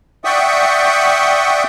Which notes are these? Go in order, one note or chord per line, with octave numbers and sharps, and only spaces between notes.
D5 E5 F#5 G5 C#6 D#6